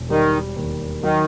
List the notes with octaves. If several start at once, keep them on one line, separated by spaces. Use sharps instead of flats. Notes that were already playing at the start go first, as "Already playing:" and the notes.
Already playing: E1
D#3 G3
D#2
D#3 F#3